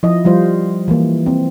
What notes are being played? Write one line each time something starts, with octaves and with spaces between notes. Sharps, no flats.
F3 E4 D#5
F3 G3 F4 C5
E3 A#3
C4